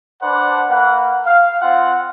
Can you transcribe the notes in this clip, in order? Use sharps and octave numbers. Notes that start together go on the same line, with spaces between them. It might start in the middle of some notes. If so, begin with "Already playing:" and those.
D4 B4 C5 D5 F#5
A#3 B4 F#5
F5
C4 F4 F5 F#5